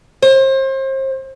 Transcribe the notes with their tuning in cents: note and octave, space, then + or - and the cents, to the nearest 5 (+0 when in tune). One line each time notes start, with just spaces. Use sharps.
C5 +35